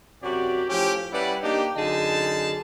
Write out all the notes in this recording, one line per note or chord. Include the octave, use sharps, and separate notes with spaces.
F#2 C3 F#3 F#4 G4 D5
A2 F3 C#4 G4
G3 C#4 E4 B4 D5 F#5
A#3 D4 D#4 G4
F#2 D3 D#4 G#4 A5